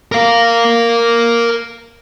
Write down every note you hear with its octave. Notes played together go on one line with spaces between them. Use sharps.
A#4 F5